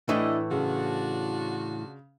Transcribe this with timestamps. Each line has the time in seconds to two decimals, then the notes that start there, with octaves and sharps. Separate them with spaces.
0.09 A2 E3 D4 E4 G4 A4 D#5
0.51 C#3 D4 F4 F#4